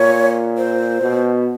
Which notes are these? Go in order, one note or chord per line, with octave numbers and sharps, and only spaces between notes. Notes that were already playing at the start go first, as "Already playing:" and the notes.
Already playing: A#2 C#5
C5
B2